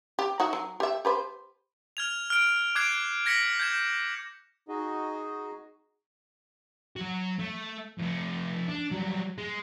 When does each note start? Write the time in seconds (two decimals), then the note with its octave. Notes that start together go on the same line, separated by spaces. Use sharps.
0.19 G4
0.40 D#4 F#4 E5
0.53 F#3
0.80 G4 E5
1.05 G4 B4 C5
1.97 F6 G#6 F7
2.30 F6 D7
2.75 D6 F#6 G#6 C7 D7
3.26 G#6 A#6 B6 C#7 F#7
3.59 G6 G#6 E7
4.68 D#4 F#4 G#4 D#5
6.96 F#3 F#4
7.39 A3
7.98 F2 A3
8.68 D4
8.91 F#3 G3
9.38 G#3